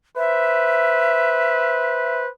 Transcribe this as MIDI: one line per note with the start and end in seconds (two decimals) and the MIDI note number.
0.17 2.30 71
0.17 2.30 72
0.17 2.19 76